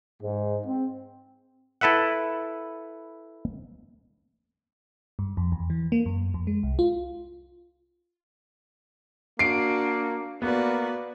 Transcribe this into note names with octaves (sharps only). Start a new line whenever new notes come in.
G#2
C4
E4 A4 B4 E5 F#5
G2
F2
E2
E3
A#3
F#2
F2
G#3
C2
F4
A#3 D4 F#4 C7 D7
A#3 B3 F#4 B4 D5